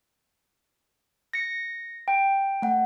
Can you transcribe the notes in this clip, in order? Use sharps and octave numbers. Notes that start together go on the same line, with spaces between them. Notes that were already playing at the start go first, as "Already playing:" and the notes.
A#6 C#7
G5
A3 F#5